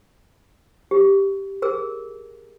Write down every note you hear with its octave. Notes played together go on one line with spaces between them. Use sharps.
G4
G#4 A#4 E6